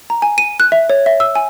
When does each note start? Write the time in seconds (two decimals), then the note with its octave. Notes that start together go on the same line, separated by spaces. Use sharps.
0.10 A#5
0.22 G#5
0.38 D#7
0.60 F#6
0.72 E5
0.90 C#5
1.06 E5
1.20 E6
1.35 G#5